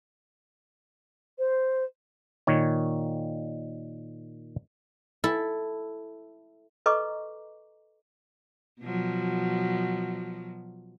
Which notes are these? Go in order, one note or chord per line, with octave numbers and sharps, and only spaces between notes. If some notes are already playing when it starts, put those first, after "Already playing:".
C5
A#2 D#3 C#5
E4 A4
A4 B4 D#5 A#5 C#6 D6
B2 F3 F#3